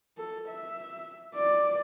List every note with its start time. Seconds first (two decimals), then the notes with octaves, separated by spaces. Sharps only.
0.17 A4
0.48 E5
1.35 D5